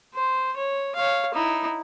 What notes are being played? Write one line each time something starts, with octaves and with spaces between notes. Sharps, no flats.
C5
C#5
C#5 F5
D#4 E4